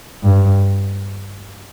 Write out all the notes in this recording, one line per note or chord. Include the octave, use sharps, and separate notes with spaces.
G2